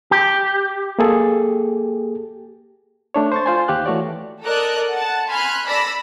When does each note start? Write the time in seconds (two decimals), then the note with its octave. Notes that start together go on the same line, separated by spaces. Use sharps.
0.11 G4
0.99 A#3 G#4 A4
3.14 A3 D4 C#5
3.32 C5 C#6 A6
3.46 F4 C5 G#5
3.68 D#2 G4 F5 F#6
3.86 E3 A3 F#4 C#5 D5
4.42 A4 A#4 D5 D#5 F#6
4.93 F#5 A5
5.30 G#5 B5 C6 F6 F#6
5.66 A4 D5 B5 E6 A#6 B6